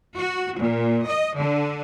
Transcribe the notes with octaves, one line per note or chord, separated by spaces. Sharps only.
F#4
A#2
D#5
D3